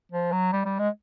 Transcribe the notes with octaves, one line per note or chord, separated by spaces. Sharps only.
F3
F#3
G3
G3
G#3